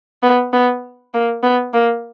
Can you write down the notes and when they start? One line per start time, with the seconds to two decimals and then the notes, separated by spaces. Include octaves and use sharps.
0.23 B3
0.53 B3
1.14 A#3
1.43 B3
1.73 A#3